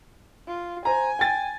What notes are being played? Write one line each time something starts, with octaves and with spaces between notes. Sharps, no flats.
F4
C5 G#5 A#5
G5 A6